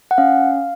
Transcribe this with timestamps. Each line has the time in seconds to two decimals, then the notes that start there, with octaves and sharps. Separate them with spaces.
0.11 F#5
0.18 C#4 F5